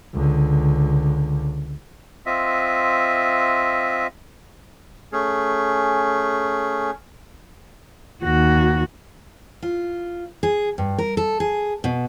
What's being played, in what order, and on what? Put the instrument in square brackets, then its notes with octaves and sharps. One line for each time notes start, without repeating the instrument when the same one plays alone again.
[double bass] C#2 D3
[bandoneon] C4 F4 D#5 E5
[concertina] A3 C#4 G#4
[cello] D#2 F#4
[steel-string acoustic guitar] F4
G#4
G2
A#4
A4
G#4
B2